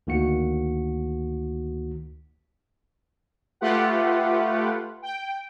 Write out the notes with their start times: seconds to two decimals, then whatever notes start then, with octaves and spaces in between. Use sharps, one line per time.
0.07 D2 D#3 A#3 F#4 C#7
3.61 A3 F4 G4 B4 F#5
5.02 G5